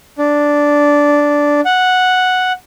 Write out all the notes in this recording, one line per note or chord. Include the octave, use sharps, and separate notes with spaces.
D4
F#5